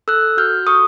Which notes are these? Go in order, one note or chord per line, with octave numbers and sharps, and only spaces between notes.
A4 E6 F#6
F#4 F6 G6
A4 C#6 D#6